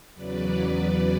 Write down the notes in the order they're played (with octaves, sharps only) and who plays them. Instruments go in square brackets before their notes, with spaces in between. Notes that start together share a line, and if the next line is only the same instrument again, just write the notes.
[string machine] E2 C#3 F#3 B4 D5